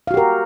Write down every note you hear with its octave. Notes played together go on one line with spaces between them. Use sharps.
F#4 G4 A#4 F5